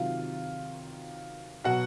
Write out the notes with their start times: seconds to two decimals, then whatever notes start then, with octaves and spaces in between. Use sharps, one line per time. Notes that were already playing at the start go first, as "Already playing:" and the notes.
Already playing: C3 D#3 F#3 F4 F5
1.64 B2 F#3 F#4 F#5